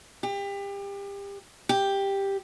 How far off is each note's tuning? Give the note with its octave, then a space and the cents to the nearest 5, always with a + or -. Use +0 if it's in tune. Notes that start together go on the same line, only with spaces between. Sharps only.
G4 +30
G4 +5